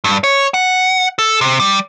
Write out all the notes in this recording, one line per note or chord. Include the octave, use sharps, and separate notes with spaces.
G2
C#5
F#5
A4
C3
G3